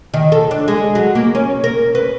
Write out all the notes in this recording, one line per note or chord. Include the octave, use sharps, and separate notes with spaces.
D#3
A4
D4
G#3
F#3
A#3
C#4
A#4
B4